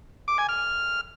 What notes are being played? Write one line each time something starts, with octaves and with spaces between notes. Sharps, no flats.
D6
G#5
F6